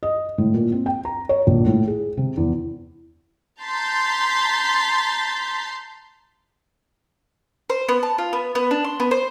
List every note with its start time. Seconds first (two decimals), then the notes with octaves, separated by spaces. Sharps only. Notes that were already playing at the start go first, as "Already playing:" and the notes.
0.03 D#5
0.38 A2
0.54 A#2
0.72 C4
0.86 G5
1.05 A#5
1.29 C#5
1.47 A#1
1.66 A2
1.88 G#4
2.17 C3
2.37 E2
3.60 A5 A#5 C6 G6 A6 B6
7.70 C5
7.89 B3
8.03 A5
8.18 F4
8.33 B3
8.55 B3
8.71 D4
8.84 C6
9.00 B3
9.11 C5